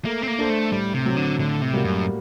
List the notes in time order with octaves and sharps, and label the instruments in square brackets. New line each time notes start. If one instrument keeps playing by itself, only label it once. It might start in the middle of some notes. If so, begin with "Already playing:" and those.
[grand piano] A3 [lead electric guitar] A#3
[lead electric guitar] C4
A#3
[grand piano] D4 A4 C5
[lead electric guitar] A3
[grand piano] A2 [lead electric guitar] G3
[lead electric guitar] C3
[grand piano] F#3 C4
[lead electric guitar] D3
[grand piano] A2 [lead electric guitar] D3
[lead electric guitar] C3
[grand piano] G3 A#3 F#4
[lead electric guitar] F#2